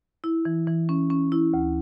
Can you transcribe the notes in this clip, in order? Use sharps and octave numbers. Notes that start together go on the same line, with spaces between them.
E4
E3
E3
C#4
C#4
E4
D2